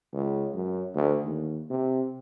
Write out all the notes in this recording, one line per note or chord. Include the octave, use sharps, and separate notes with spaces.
C#2
F#2
D2
D#2
C3